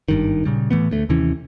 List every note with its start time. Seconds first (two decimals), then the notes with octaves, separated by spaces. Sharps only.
0.09 G#1 G2 D#3
0.45 A#2 C#3 G3
0.71 A2 E3 A3 B3
0.91 D2 A3
1.09 D#2 C3 E3 C#4